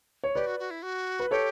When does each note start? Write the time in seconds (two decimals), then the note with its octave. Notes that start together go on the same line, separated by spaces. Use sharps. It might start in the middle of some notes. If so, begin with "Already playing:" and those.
0.24 C#5
0.34 G4 B4 D5
0.46 F#4
0.59 F#4
0.71 E4
0.83 F#4
1.20 B4
1.31 G4 A4 C#5